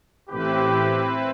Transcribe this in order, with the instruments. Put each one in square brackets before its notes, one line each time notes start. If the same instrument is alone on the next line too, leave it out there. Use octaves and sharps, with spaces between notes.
[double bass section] A1 [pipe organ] C4 E4 B4 [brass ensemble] G4